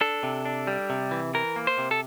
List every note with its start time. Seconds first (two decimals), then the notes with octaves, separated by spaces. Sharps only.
0.01 D4 A4
0.23 C3
0.45 D4
0.67 G3
0.90 C3
1.11 E3
1.34 E3 A#4
1.56 A#3
1.67 C5
1.78 C3
1.91 A4